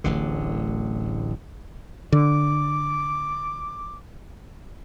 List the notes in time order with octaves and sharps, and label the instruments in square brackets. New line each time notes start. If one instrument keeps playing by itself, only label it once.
[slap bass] D1 A1 D3
[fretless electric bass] D3 [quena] D6